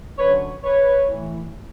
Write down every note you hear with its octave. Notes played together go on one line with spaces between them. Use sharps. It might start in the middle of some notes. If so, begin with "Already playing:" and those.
F#2 D3 B4 C#5
B4 C#5
A2 E3